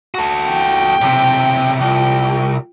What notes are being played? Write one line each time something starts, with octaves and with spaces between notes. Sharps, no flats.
F#4 A4
G5
B1 C3
C2 F4 G5